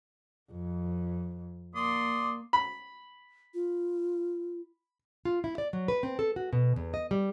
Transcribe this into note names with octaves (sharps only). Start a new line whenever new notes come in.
F2
A#3 D5 C6 D#6
B5
F4
F4
E4
D5
F#3
B4
C4
A4
F#4
B2
E2
D#5
G3